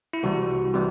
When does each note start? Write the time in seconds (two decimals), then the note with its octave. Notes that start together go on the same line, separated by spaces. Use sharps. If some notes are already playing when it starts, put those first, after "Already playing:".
0.13 E4
0.23 C2 C3 E3 G3 F#4
0.73 C3 E3 G3